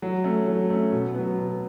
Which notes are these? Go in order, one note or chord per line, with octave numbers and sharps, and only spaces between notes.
F#3
A3 C#4
F#3
A3 C#4
B2
F#3 B3
B2